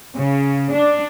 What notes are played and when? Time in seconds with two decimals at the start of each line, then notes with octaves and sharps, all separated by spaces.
0.16 C#3
0.75 D4